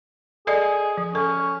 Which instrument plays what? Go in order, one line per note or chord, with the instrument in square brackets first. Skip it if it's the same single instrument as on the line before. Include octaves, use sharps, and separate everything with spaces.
[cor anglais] G#4 [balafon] A4 D5 D#5
[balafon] F3
[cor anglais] C#4 [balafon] A4